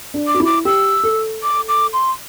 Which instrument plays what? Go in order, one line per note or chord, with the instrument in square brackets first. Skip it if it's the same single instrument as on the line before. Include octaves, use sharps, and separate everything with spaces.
[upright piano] D4
[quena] D6
[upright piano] F#4
E4
[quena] D6
[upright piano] G4 [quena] E6
[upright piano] A4
[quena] D6
D6
C6